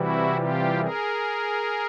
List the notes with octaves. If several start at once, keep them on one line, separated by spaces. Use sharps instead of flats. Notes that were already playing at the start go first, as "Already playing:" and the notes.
Already playing: C3 E3 G3 E4 F#4
F4 G4
G#4 A#4